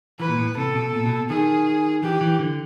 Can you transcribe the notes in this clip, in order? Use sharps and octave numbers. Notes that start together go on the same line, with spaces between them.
E3 B4
A#2
A2
C3 A4
B2
A#2
B2
D#3 G#4
E3 G4
E3
D3